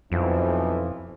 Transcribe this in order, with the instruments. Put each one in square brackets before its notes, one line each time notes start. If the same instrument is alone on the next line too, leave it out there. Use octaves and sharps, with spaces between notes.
[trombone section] B1 E3 F3 [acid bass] F2